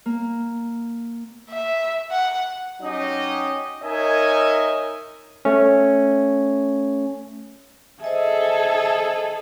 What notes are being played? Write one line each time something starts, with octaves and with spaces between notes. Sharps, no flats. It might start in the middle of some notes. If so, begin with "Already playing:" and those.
A#3
E5
F#5
F#3 C#4 D#4 G4 D#5
D#4 A#4 C#5 D#5 E5 G#5
A3 C#4
G#4 A4 C5 D#5 E5 G#5